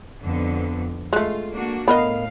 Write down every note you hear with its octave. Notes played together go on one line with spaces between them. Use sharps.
F2 D3 B3
G#3 A3 F4
A#3 D4 F#4
A2 B3 A#4 D#5 F5